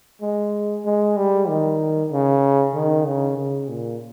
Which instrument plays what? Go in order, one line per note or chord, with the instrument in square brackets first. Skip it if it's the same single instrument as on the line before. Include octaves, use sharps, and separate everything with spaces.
[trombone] G#3
G#3
G3
D#3
C#3
D#3
C#3
C#3
A#2